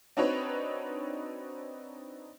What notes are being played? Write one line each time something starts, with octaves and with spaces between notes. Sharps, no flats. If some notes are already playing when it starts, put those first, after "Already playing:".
C4 D4 D#4 F#4 B4 C#5